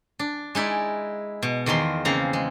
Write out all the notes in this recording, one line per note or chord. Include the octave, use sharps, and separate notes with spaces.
D4
G#3 D#4 E4 D5
B2
E2 D#3 F3 A#4 C6
C#3 A#3 C4 A#5
G#3